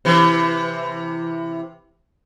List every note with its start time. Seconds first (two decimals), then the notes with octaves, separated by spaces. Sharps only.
0.05 C3 E3